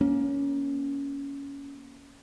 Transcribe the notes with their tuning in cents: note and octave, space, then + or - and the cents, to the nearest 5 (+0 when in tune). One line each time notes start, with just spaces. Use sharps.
A#3 +25 C#4 +15